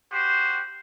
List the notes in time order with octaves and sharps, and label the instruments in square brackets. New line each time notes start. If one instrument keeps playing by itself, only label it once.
[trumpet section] F#4 G4 C5